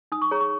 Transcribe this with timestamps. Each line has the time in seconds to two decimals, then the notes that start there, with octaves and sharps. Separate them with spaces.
0.12 D#4 D#6
0.22 C#6
0.31 G#4 C#5 A#5
0.41 C#6